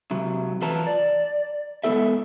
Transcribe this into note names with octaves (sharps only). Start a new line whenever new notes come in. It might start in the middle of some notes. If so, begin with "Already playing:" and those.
C3 F#3
E3 F4 B4 A5 A#5
D5
G#3 B3 E4 A4 E5